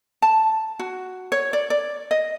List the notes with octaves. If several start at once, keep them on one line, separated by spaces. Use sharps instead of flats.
A5
F#4
C#5
D5
D5
D#5